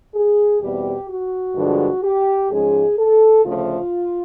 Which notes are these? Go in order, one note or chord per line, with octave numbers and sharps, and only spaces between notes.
G#4
E2 B2 G3 C4 G4
F#4
G2 D3 F3 G#3
G4
G#2 F3 G#3 C#4 G#4
A4
D2 C#3 F3 A3 F4